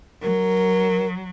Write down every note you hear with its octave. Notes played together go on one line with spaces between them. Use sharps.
F#3 A#4